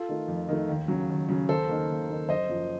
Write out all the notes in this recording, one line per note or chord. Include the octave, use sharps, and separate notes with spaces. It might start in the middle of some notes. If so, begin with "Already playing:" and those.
Already playing: F4 A4
D#3 A3
F2
D#3 A3
D#2
C#3 F#3
D#2
C#3 F#3
D#2 A4 C5
D#3 A#3
D#2
D#3 A#3
F#1 C5 D#5
F#2 F3